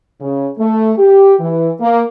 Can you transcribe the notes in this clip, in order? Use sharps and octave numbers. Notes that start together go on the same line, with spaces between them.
C#3
A3
G4
E3
A#3